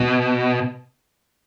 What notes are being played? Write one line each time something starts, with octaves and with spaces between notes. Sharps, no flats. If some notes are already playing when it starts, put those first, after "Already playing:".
Already playing: B2